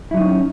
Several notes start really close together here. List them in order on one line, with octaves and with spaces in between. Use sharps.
E4 F#3 D#4 C#4